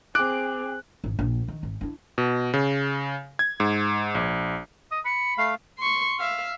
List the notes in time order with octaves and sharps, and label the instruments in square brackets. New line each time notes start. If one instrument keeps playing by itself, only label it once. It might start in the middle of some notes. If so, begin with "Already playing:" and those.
[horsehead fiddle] C4 G#4 [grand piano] D6 F#6 D7
[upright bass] G#1
A#1
D#3
G#1
D4 E4
[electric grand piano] B2
C#3
G#6
G#2
A#1
[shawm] D#5
[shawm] B5 [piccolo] C#7
[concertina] A3 F5 [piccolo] C7
[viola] C6 C#6
E5 F5